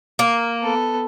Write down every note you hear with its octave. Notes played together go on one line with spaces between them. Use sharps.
A#3
B3 A4